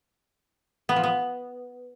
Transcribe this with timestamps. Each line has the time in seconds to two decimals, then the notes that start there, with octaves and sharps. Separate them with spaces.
0.89 B3
0.96 F3
1.04 B3